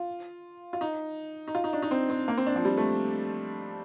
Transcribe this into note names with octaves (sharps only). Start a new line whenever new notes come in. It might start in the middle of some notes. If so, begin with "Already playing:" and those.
Already playing: F4
F4
D#4
D#4
F4
D#4
D4
D#4
C4
C4
A#3
C4
D4
F3
G3
A3